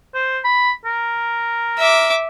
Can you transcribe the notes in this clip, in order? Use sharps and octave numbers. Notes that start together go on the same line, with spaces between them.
C5
B5
A#4
E5 D6